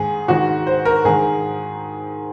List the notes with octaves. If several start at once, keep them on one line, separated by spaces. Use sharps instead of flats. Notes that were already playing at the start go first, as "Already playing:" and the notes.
Already playing: G#2 D#3 G#4
G#2 D#3 F#4
C5
A#4
G#2 D#3 G#4